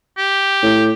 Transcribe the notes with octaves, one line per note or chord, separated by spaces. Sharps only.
G4
A2